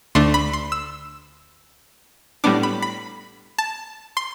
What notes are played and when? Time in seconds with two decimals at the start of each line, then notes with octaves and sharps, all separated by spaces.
0.15 D2 D3 A3 D4 C6
0.34 B5
0.53 C6
0.72 E6
2.44 A2 G3 B3 D4 D6
2.63 B5
2.82 B5
3.58 A5
4.17 C6